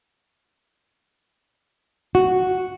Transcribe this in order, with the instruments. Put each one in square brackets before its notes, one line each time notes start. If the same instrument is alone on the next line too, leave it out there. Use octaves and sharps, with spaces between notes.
[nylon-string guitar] F#4